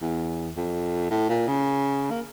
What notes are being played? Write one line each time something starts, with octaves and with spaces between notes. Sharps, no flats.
E2
F2
A2
A#2
C#3
A#3